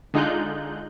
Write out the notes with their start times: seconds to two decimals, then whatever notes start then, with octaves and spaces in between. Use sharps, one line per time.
0.14 D3 G#3 D#4 F4 F#6 G6